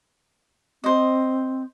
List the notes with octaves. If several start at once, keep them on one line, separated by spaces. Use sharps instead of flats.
C4 C5 D#5